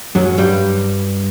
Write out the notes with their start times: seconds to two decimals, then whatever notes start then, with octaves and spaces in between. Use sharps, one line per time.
0.15 F#2 F#3
0.38 G2 G3